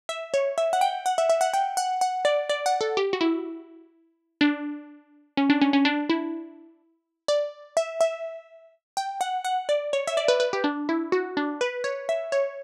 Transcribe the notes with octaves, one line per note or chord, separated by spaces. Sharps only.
E5
C#5
E5
F#5
G5
F#5
E5
E5
F#5
G5
F#5
F#5
D5
D5
F#5
A4
G4
F#4
E4
D4
C#4
D4
C#4
C#4
D4
E4
D5
E5
E5
G5
F#5
F#5
D5
C#5
E5
D5
B4
B4
G4
D4
E4
F#4
D4
B4
C#5
E5
C#5